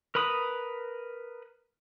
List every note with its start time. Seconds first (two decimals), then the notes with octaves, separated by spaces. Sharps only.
0.15 A#4 B4 B5 D#6